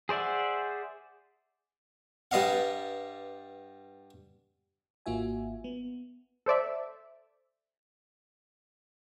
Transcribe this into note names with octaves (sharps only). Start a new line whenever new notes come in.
G#4 C5 D5 E5 F#5
G2 G3 B4 D#5 F5 F#5
G#1 A#3 F4 F#4 E5 G#5
B3
A4 C5 D5 E5